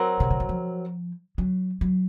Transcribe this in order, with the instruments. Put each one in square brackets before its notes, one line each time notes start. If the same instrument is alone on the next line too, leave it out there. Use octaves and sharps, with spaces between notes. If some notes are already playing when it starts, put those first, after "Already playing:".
Already playing: [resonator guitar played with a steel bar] F#3 C4 F#4 A#4
[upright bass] C3
C#3
D#3
F3
F#3
F#3